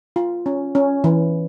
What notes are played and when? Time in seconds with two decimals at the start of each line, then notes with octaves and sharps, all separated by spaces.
0.16 F4
0.46 C#4
0.75 C#4
1.04 E3